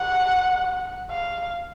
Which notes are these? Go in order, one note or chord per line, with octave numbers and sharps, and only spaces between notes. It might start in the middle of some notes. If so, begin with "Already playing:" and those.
Already playing: F#5
F5